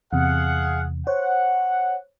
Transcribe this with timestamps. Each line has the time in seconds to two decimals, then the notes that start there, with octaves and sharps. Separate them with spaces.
0.13 E2 C3 G#4 F5 F#5
1.07 C5 C#5 F#5